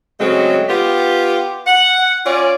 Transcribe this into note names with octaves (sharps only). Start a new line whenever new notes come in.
C#3 F#3 G#3 A3 C4
B3 F4 G4
F#5
C#4 F4 D5